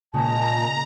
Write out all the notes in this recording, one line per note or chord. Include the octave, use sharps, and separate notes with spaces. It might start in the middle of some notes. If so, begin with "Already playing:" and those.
A#2 C#3 G#3 A5 A#5